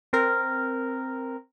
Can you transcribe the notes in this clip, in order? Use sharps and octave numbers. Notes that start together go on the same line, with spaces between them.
C4 A#4